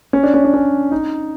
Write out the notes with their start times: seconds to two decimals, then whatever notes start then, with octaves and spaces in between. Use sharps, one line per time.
0.13 C#4
0.23 D4
0.34 C#4
0.44 D4
0.54 C#4
0.91 D#4